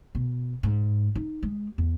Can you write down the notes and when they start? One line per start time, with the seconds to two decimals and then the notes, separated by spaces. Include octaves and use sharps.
0.15 B2
0.63 G#2
1.15 D#4
1.43 G#3
1.78 E2